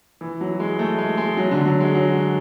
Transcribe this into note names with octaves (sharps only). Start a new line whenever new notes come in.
E3
F#3
G#3
A3
G#3
G#3
F#3
D3
F#3
G#3
F#3